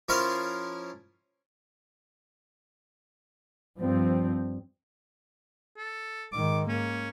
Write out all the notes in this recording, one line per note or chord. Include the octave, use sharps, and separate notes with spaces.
F3 C#4 E4 A#4 C5 F5
G2 F3 C4
A4
G#2 D#3 D6
A#3 C#4